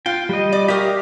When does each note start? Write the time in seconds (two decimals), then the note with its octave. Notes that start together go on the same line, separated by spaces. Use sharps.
0.06 F4 G5
0.29 G3 D#5
0.52 D5
0.68 G4 A#4 E5 F5 D#6